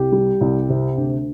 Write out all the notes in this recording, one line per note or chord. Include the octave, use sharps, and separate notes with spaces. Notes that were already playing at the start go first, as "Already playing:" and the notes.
Already playing: C2 G4
G3
C2
C3
D2